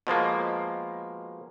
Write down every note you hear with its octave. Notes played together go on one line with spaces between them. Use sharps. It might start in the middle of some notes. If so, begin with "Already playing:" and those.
B2 F3 G#3 A#3